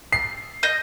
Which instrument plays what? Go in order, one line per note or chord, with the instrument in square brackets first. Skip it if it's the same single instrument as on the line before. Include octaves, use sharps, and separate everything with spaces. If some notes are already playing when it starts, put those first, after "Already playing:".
[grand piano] C7
[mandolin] D#5 G6